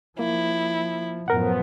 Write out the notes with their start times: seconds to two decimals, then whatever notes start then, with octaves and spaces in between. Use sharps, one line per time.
0.19 F3 A#3 E4
1.28 F#2 A2 F3 B3 A#4 F#5